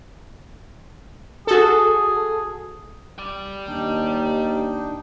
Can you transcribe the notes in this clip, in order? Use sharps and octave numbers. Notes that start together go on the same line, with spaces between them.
F#4 G#4 A4
G4 D5
D#2 D4 D#4 G5